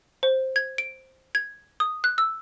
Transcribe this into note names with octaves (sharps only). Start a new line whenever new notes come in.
C5
G#6
D7
G#6
D#6
F#6
E6